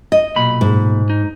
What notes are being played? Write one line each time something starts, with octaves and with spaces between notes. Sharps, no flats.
D#5
B1 A#2 B5
G#2
D#4